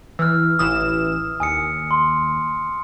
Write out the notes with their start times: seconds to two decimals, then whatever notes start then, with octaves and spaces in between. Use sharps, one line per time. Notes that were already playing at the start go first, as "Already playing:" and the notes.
0.19 E3 E6 F6
0.59 A1 E3 D#6 E7
1.40 D#2 G#5 D#6 C#7
1.91 C6